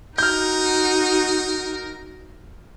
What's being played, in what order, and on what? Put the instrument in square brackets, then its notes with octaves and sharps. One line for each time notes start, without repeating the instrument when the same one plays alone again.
[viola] D#4 F#4 [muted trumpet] A#4 [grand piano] F6 G6